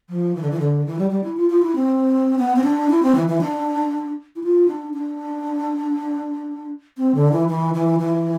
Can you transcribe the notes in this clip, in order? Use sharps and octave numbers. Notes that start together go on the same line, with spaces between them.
F3
E3
D3
E3
D3
E3
G3
G3
E4
F4
F4
E4
C4
B3
C4
D4
E4
C4
E3
E3
D4
E4
F4
D4
D4
C4
D3
E3
E3
E3
E3